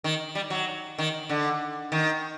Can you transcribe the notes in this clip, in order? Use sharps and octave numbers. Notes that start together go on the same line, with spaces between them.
D#3
G3
F#3
D#3
D3
D#3